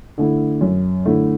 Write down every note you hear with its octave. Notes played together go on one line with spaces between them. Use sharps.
D3 A3 E4
F#2
D3 A3 E4